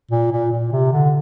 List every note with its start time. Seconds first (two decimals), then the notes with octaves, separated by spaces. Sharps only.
0.11 A#2
0.32 A#2
0.52 A#2
0.72 C3
0.92 D3